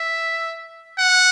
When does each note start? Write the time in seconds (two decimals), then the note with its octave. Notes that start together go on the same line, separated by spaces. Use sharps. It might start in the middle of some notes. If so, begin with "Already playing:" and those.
Already playing: E5
0.98 F#5